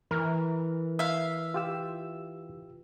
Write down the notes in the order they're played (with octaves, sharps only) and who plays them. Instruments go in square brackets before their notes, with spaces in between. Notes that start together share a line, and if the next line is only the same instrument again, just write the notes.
[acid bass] E3 [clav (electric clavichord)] A#4
[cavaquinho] E5 F5
[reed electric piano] F4 G4 E6